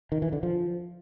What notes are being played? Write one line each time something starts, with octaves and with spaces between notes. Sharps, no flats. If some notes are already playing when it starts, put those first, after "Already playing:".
D#3
E3
D3
F3